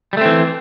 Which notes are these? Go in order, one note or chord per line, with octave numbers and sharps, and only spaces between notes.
E3 G3 A3 C4